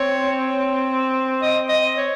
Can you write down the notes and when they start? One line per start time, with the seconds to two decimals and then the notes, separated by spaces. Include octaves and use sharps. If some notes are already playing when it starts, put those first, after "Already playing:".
Already playing: C4 C#5
1.42 D#5
1.69 D#5
1.98 C#5